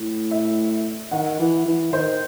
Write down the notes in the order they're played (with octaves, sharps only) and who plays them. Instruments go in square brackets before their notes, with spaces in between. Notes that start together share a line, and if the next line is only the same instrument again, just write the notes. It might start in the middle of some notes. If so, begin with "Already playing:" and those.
Already playing: [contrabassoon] A2
[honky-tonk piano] E5
[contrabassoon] D#3 [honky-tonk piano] F#5
[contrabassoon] E3
E3
[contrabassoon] D#3 [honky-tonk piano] C5